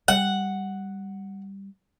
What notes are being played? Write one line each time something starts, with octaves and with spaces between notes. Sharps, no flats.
G3 F#5